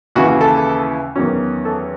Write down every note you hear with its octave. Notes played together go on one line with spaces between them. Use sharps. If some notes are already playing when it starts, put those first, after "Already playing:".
D#2 C#3 E3 F#4
A4
E2 D#3 F#3 C#4
A4